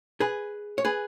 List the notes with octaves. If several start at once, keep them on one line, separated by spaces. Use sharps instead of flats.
G#4 B4
C#5
G#4 B4